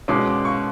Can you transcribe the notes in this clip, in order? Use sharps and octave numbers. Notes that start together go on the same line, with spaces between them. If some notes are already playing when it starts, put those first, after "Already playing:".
B2 G#3 C#4 D6
D6
C#6